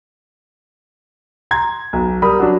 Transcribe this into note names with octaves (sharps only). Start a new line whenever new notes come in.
A#5 C6 G#6
B1
G3 A#4 B5 D#6
F#3 D4